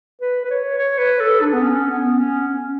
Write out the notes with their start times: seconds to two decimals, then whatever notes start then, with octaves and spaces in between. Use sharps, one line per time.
0.21 B4
0.45 B4
0.50 C#5
0.78 C#5
0.99 B4
1.21 A4
1.42 D4
1.53 B3
1.63 C#4
1.91 B3
2.19 C#4
2.48 C#4